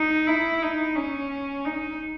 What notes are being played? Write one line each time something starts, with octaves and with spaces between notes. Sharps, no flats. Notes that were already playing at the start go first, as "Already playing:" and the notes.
Already playing: D#4
E4
D#4
C#4
D#4